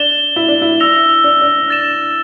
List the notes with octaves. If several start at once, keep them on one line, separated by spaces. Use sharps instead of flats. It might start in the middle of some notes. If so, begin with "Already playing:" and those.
Already playing: D4 A6 E7 G7
E4
D4
E4
E6 A#6 F7
D4
D4
F6 A6 E7